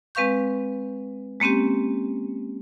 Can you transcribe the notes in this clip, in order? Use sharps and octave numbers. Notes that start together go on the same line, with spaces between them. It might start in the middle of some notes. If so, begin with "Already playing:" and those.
G#3 C4 B4 F5 C#6 G6
G#3 A#3 C4 C#4 G4